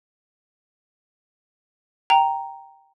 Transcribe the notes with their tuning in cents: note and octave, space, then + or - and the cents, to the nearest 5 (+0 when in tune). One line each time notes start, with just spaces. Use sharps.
G5 +0 A#5 +0